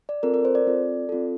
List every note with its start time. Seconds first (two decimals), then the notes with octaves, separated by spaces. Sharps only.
0.09 D5
0.23 C4 F4 A4 A#4
0.34 A#4
0.45 C5
0.55 D5
0.67 C4 F4 A4
1.09 C4 F4 A4